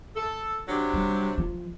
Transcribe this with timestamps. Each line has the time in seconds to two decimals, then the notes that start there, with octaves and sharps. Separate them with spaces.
0.15 A4
0.69 C3 F#3 D4
0.94 G3
1.38 F3